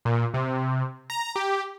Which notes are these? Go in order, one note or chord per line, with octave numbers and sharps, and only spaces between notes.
A#2
C3
A#5
G4